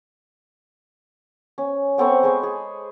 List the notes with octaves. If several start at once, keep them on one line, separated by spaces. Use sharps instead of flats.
C#4
B3 C4 A4 C#6
G#3 G#4 C5 C#6
G#4